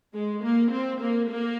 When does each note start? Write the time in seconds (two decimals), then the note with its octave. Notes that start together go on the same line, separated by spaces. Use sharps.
0.14 G#3
0.43 A#3
0.72 C4
1.01 A#3
1.29 A#3